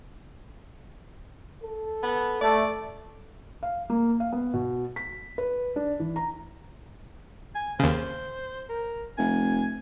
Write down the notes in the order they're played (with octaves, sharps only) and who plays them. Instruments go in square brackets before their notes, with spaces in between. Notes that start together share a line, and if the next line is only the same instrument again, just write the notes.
[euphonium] A4
[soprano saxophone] B3
[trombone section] A3 [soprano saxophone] D5
[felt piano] F5
A#3
F5
B3
B2
B6
B4
D4
E3
A#5
[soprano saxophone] G#5
[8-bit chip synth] D#2 C#3 [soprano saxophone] C5
[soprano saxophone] A#4
[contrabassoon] F1 [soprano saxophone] G#5